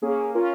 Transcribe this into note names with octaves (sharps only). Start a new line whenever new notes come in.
A#3 C#4 G#4
C#4 F4 A#4